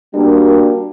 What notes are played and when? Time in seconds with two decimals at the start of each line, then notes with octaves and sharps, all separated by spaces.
0.13 G3 A#3 D4 F#4 A#4